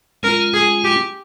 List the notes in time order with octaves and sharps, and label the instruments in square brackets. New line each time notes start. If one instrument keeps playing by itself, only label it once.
[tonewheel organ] G#3 C#4 F4 [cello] A#4
[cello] G#4
G4